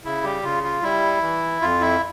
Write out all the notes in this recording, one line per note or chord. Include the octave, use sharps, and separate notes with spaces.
C#3 E4
G3 G4
C#3 F4
F4
G3 E4
E3
F2 F4
E4